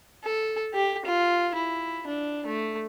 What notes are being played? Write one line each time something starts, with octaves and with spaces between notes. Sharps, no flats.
A4
G4
F4
E4
D4
A3